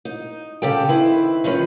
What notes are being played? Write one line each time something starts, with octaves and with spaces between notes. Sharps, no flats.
D#4
C#3 G4 A4 G5
D#3 C4 E4 B4
D#3 F3 C#4 B4